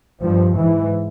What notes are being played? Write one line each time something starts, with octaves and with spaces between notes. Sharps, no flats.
G2 F3
G#2 E3